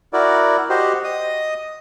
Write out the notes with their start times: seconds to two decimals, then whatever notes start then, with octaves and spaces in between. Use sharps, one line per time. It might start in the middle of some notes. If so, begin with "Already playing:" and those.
0.13 E4 F#4 A#4 D5
0.69 F#4 G4 C5 D#5
1.04 D#5 D#6